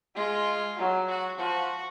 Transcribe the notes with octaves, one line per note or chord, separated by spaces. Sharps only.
G#3 F4
F#3
F#4
F3 F#4